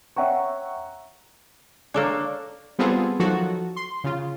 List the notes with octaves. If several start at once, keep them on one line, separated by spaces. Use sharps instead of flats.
C#5 E5 F#5 G5 A#5 C#6
A#3 D4 A4 C#5
G3 B3 C4 F4 G#4 A4
D#3 F3 F#3 F#4 A4
C6
C#3 F4